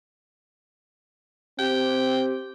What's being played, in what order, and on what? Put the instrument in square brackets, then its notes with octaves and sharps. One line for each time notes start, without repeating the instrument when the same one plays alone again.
[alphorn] C4 [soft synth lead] G4 [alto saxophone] G5